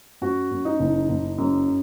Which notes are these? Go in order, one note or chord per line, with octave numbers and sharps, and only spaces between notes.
F#2 F#4
F#2
D#4
F#1
F#1
F#2